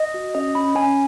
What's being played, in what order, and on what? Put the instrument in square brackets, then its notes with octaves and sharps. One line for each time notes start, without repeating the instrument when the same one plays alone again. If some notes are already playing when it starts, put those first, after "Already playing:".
Already playing: [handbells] D#5
F#4
C#4 D#5
C#4 B5
C#4 G#5